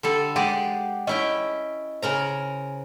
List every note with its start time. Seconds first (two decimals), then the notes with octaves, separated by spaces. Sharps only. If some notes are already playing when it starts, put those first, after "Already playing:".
0.03 D3 G3 A4
0.36 G#3 G4 D5 F#5 G5
1.07 C#4 E4 D#5 G5
2.02 C#3 A#4 C5 G#5 A#5